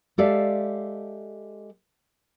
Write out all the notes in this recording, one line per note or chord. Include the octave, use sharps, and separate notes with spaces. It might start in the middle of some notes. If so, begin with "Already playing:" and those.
G#3 G4 A4 D5 E5 F5